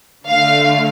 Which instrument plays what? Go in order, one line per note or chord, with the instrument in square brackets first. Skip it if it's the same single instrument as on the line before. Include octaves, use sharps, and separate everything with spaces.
[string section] D3 A3 F5